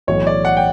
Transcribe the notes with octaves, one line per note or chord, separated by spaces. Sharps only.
B1 A2 E3 C#5
D5
F#5
G5